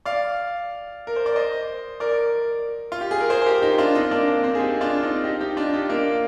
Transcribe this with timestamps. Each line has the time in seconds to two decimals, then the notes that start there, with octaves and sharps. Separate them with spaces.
0.06 D5 F5
1.07 A#4
1.16 C5
1.26 D5
1.36 C5 D#5
2.00 A#4 D5
2.92 F4
3.01 G4
3.11 G#4
3.20 A#4
3.30 G#4 C5
3.41 C5
3.46 G4 A#4
3.62 D#4 G4
3.78 D4 F4
3.95 C4 D#4
4.11 A#3 D4
4.27 C4
4.44 C4
4.55 G#4
4.59 D#4 G4
4.81 D4 F4
5.02 C4 D#4
5.24 D#4 G4
5.40 D#4 G4
5.57 D4 F4
5.73 D#4 G4
5.89 A#3 D4